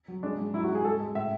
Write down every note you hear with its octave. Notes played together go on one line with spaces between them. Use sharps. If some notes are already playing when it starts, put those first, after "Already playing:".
F#3
G#3 D4
G#2
F#3 E4
F#4
G#2
G#4
G#3 A4
G#3
A2 E5